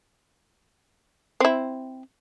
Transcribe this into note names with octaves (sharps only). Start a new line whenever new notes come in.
C4 E4